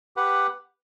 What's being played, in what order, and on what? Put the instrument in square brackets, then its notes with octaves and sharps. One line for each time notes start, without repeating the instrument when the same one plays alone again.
[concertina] G4 B4 F#5